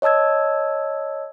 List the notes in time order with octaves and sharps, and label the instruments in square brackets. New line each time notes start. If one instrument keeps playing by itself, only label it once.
[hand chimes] C#5 D#5 A5 E6 G#6